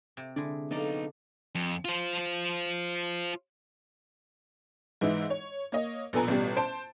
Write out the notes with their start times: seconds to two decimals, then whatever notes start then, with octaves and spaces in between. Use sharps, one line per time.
0.17 C3
0.36 D3 G#3 E4 D5
0.71 B3 D#4 A4 D5 F5
1.55 F2
1.85 F4 C5
5.01 G#2 E3 D#4 E4
5.30 C#5
5.72 A#3 C#5 D#5
6.13 A#1 B2 A4 B4 G#5 A#5
6.28 A1 B2 G3
6.57 C5 A5 D7